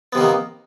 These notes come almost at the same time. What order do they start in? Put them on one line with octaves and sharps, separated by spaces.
B3 C3 D#3 A#3